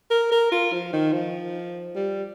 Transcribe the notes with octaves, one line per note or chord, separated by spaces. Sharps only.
A#4
A#4
F4
F3
D#3
F3
G3